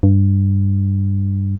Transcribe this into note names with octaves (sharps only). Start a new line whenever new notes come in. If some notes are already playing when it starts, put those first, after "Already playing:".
G2